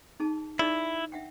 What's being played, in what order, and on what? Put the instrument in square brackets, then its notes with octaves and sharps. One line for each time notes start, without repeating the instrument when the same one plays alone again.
[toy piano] D#4 G#4 A5
[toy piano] D#4 G#4 D5 [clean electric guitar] E4
[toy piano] E5 F#5 G5